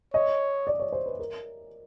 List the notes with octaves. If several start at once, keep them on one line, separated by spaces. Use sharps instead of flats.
C#5 D#5
D5
C#5
C5
B4
A#4